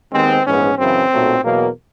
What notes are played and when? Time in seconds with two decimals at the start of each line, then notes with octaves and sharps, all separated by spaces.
0.13 D#2 D#3 G#3 B3 C4
0.46 A#1 G#2 E3 G#3 B3 C#4
0.78 F#2 C#3 E3 C4
1.11 B1 A#2 F#3 A3
1.44 E2 B2 F#3 A#3